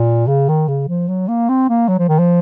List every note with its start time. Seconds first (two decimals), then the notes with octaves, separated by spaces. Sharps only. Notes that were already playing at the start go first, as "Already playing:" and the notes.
Already playing: A#2
0.27 C#3
0.49 D#3
0.68 C#3
0.88 F3
1.08 F#3
1.28 A#3
1.49 C4
1.69 A#3
1.88 F#3
1.99 F3
2.09 D#3
2.19 F3